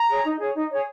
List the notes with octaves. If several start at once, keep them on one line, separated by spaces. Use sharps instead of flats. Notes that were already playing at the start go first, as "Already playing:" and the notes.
Already playing: A#5
G#4 C#5
D#4
G#4 C#5
D#4
G#4 C#5